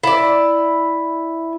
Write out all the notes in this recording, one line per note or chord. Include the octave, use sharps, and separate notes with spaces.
E4 D5